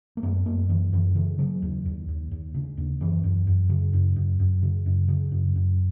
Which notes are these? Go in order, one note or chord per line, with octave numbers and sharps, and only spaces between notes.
A#3
F#2 B3
F#2 A#3
F#2 E3
F#2 E3
C#3 E3
C#3 F#3
D#2
D#2
D#2
D#2
C#3
D#2
F#2 E3
F#2
F#2
C#3
F#2
F#2
F#2
C#3
F#2
C#3
F#2
F#2